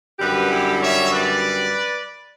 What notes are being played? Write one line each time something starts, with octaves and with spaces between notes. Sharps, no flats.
F#2 D3 G3 G4 B4
E4 G4
C#5 E5
B4 D5